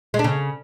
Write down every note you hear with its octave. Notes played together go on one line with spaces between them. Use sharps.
G#3
D4
C#3